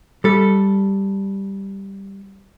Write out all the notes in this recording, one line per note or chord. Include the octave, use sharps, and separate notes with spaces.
G3 A4